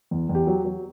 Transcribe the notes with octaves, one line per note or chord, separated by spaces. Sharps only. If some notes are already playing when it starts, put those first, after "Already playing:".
E2
E2
G4
F#3
F#3